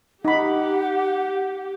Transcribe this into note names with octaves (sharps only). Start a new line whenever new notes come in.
D#4 G4 F#5 B5